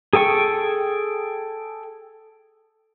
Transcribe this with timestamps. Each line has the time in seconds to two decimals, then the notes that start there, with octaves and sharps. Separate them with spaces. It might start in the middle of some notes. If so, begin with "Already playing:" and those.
0.13 G#4 A4 G5 C#6